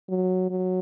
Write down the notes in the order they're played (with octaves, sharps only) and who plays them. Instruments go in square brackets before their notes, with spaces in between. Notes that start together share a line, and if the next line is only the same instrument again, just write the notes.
[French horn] F#3
F#3